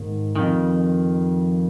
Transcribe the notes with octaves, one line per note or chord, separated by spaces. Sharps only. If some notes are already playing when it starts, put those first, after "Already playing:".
Already playing: G#2 D#3
F2 D#3